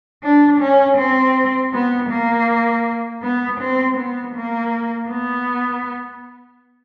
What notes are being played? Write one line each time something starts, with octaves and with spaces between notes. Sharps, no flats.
D4
C#4
C4
B3
A#3
B3
C4
B3
A#3
B3